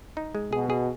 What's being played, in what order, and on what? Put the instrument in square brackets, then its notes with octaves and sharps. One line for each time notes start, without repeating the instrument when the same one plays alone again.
[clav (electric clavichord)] D#4
G#3
[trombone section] B2 [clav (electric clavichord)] G#4
[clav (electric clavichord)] G#4